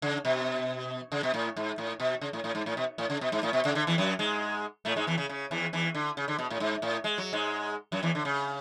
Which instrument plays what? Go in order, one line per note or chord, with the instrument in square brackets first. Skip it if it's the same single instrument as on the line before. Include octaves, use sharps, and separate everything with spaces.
[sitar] C#3
B2
C#3
B2
A2
G#2
A2
B2
C#3
A2
A2
G#2
A2
B2
A2
C#3
B2
G#2
A2
B2
C#3
D3
E2 E3
F#2 F#3
G#2 G#3
A2 A3
G#2 G#3
E2 E3
C#3
C#3
E2 E3
E2 E3
D3
C#3
D3
B2
A2
G#2
A2
G#3
F#3
G#2 G#3
F#2 F#3
E2 E3
D3
C#3